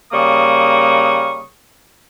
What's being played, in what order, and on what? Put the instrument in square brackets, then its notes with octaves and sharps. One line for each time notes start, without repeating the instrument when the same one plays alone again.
[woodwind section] C#3 G3 A#3 C#6 D#6